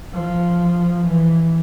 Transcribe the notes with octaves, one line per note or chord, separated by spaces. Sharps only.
F3
E3